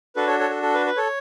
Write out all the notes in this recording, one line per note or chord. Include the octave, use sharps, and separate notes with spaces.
D4 F#4 A4 B4
A4 C#5
A4 C#5
A4
A4
B4
B4
A4 C#5